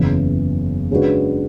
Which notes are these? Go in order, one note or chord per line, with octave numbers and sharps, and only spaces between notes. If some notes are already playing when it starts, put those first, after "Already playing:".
Already playing: F#1 E2 C#3 E3 B3
C#3 G#3 D4 F#4 B4